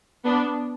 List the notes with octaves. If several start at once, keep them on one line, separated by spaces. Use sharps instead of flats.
B3 D4